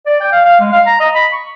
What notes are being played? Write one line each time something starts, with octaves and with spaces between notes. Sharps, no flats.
D5
G5
F5
F5
G#3
F5
A#5
D#5
B5
C#6